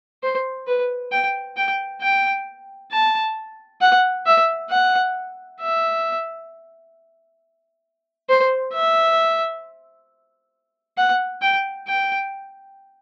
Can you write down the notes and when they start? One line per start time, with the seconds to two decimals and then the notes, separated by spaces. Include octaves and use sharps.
0.23 C5
0.67 B4
1.12 G5
1.57 G5
2.02 G5
2.92 A5
3.81 F#5
4.26 E5
4.70 F#5
5.61 E5
8.29 C5
8.74 E5
10.98 F#5
11.42 G5
11.88 G5